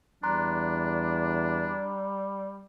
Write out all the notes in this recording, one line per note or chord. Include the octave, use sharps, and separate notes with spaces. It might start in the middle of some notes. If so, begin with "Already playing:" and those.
E2 G3 D4 A#5 C6 F#6